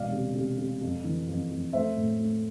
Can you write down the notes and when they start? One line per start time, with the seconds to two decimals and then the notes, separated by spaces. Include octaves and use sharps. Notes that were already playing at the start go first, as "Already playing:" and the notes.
Already playing: E1 B2 D5 F5
0.12 C3
0.35 C3
0.58 C3
0.81 F2
1.04 E3
1.28 F2
1.50 F2
1.73 A3 C5 E5
1.97 A2
2.19 A3